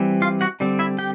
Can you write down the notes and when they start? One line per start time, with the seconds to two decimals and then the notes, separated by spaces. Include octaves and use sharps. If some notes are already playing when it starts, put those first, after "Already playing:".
Already playing: E3 G3 C4
0.22 F4 F5
0.41 F#4 F#5
0.60 D3 G3 C4
0.79 E4 E5
0.99 G4 G5